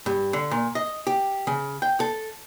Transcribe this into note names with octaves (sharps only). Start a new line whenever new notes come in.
G2
D3
A#2
D#5
G4
C#3
G5
A4